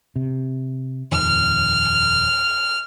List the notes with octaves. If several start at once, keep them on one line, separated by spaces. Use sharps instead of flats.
C3
D#1 F2 D#3 F6